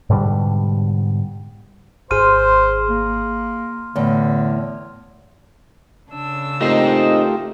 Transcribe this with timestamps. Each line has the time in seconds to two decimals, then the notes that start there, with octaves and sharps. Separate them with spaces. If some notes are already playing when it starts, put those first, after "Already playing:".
0.10 G#2 B2 D3 G3
2.11 G#1 G#4 C5 C6 F6 D#7
2.89 A#3
3.96 E2 A2 D3 C#5
6.09 C#3 D4 E6
6.61 A3 A#3 C4 D#4 F4 G4 C5 D#5